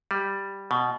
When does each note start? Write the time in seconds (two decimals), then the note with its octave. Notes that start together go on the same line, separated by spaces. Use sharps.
0.11 G3
0.71 B2